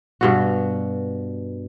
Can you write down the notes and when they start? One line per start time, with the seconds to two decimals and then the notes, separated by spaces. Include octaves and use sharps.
0.21 G2 B2 F#4